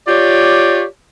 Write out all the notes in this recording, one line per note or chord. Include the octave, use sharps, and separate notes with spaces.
F4 G4 C#5 D5